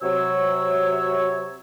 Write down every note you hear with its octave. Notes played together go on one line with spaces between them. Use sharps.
C3 F#3 C#5 E6